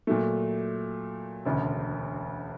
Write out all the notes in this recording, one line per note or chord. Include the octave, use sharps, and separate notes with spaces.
A#2 F#3 A3
E1 D2 C#3